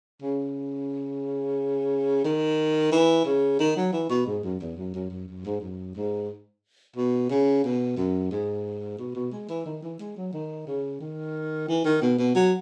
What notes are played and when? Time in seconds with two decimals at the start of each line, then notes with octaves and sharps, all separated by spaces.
0.22 C#3
2.25 D#3
2.92 E3
3.25 C#3
3.60 D#3
3.77 F#3
3.93 E3
4.10 B2
4.26 G#2
4.44 F#2
4.60 E2
4.77 F#2
4.94 F#2
5.10 F#2
5.28 F#2
5.45 G#2
5.61 F#2
5.95 G#2
6.96 B2
7.30 C#3
7.64 B2
7.97 F#2
8.31 G#2
8.99 B2
9.15 B2
9.32 G#3
9.49 E3
9.66 D#3
9.83 E3
9.99 G#3
10.16 F#3
10.33 D#3
10.67 C#3
11.01 D#3
11.68 E3
11.85 D#3
12.02 B2
12.19 B2
12.35 F#3